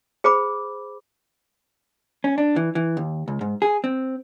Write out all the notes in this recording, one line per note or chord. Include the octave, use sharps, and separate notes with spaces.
G#4 C5 B5 D6
C#4
D4
E3
E3
D#2
C#2
G#2
G#4
C4